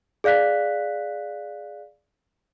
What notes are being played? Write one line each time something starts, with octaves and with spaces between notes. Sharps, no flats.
G#4 D5 F5 F#6 B6